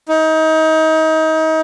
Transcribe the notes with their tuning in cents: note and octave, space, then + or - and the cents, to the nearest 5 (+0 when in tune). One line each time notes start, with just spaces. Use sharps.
D#4 +30